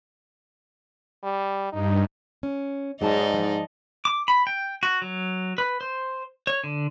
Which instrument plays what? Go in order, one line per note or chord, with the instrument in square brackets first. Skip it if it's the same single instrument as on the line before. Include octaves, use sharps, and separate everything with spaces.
[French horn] G3
[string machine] G2 [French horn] D#4
[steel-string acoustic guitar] C#4
[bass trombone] G#2 [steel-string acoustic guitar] F#3 G#4 A5 [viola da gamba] D#4 D5 D#5
[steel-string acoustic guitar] F3
[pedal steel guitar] D6
B5
G5
F#4
F#3
B4
C5
C#5
D3